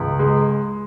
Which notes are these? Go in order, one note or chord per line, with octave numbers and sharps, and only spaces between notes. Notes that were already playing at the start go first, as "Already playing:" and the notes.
Already playing: C#2
G#3